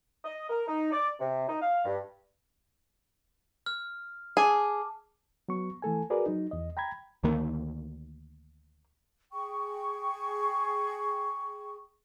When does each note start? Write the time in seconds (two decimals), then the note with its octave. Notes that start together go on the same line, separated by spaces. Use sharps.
0.25 D#5
0.50 A#4
0.67 D#4
0.92 D5
1.20 C3
1.48 D#4
1.61 F5
1.85 G2
3.66 F6
4.37 G#4 A5 D6
5.49 F#3 B3 C#6
5.82 E3 A3 A4 G#5
6.10 F#4 G#4 A#4 B4 D5
6.26 F#3 D#4
6.51 E2 D#5
6.77 G5 A#5 B5 G#6
7.24 D2 D#3 A#3
9.33 G#4 G5 C#6